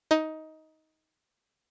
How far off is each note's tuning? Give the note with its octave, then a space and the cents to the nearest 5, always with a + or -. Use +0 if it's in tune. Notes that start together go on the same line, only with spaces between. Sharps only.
D#4 +15